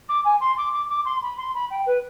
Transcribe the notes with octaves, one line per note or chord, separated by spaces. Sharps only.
D6
G#5
C6
D6
D6
D6
C6
B5
C6
B5
G5
B4